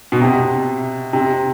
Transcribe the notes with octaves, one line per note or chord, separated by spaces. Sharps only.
B2
C3
C3